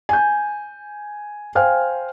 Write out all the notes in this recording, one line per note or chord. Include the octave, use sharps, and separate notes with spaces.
G#5 G6
C5 F5 G5 G#5 F6